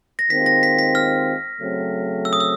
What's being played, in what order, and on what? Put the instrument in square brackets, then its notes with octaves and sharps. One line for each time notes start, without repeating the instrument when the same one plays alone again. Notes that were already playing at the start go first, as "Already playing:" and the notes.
[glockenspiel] A#6
[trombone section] D#2 D#3 G#3 C4 F4 [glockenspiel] B6
[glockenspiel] A#6
B6
B6
F6
[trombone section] C#3 F#3 A3 C4
[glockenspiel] E6
D#6
E6